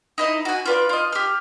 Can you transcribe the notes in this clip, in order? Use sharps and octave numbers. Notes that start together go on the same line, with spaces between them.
D#4 E4 D#5
F#4 G#5
F4 B4 D5
F4 D#5
G4 F6